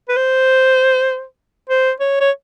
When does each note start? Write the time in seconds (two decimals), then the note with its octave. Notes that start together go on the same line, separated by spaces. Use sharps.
0.09 B4
0.16 C5
1.70 C5
2.00 C#5
2.21 C#5